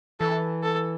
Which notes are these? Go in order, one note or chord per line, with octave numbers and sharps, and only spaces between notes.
E3 A4
A4